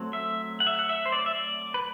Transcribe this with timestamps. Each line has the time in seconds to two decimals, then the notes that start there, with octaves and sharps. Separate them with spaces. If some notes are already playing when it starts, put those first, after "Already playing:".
Already playing: F#3 A3 C4
0.13 E5
0.60 F#5
0.67 E5
0.79 F#5
0.89 E5
1.06 C5
1.12 D5
1.26 E5
1.34 D5
1.74 B4